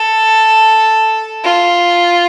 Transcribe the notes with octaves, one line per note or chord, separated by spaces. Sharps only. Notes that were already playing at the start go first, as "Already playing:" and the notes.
Already playing: A4
F4